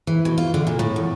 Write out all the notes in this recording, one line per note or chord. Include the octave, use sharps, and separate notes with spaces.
E3
B2
F4
D3
A#2
A2
E2